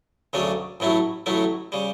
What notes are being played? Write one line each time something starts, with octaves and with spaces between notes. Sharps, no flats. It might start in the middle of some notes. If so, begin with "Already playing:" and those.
D2 C#3 F#3 A3 D4
A1 A2 F#3 A3 E4
A1 A2 F#3 A3 E4
C#3 G3